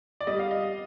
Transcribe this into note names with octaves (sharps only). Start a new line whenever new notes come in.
D5
G3 D#5
F5
D#5